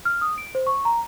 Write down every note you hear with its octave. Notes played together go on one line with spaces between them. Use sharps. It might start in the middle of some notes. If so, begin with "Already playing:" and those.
F6
D#6
D7
C5
C#6
A#5